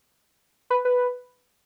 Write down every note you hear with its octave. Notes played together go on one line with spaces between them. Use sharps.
B4
B4